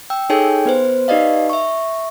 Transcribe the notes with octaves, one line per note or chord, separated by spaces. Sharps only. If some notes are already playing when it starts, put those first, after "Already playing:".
G5 E6
D#4 G#4 A4 C#5 G5 G#5
B3 B4 C5
D#4 G4 B4 D5 D#5 F5
E5 C#6